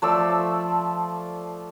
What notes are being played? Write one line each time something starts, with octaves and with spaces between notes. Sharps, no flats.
F3 A3 D5 E6